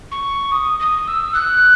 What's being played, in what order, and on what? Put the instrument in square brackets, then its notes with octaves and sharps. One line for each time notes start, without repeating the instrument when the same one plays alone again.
[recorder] C#6
D#6
D#6
E6
F#6